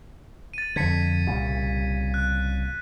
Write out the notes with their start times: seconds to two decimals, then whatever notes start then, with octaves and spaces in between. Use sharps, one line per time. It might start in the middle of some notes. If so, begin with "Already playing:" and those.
0.54 A6 D#7
0.76 F2 D3 G#6 B6 C#7
1.27 C2 A#2 C#3
2.14 F#6